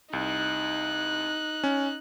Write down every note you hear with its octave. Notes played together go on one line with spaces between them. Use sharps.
C2 D#4 F#6
C#4